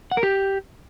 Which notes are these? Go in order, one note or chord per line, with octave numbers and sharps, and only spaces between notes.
F#5
A#4
G4